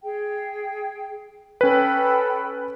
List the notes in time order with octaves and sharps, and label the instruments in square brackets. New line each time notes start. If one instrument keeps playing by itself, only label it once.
[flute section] G#4 G5
[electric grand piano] C#4 B4 [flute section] A4 G5 B5